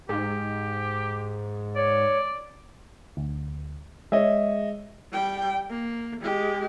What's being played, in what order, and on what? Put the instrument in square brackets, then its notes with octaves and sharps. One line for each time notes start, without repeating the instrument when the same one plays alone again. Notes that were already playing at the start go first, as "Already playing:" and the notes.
[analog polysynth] G#2 [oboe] G4
[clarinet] C#5 [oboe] D5
[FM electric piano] D2
[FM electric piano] G#3 [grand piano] C#5 D#5 E5
[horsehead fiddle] G3 G5
A#3
G#3 G4